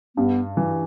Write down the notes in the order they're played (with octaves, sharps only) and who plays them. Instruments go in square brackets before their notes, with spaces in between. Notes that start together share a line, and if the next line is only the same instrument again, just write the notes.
[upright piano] G2 [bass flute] B3
[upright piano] E3